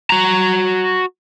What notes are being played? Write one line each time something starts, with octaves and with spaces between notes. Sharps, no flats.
F#4 A#5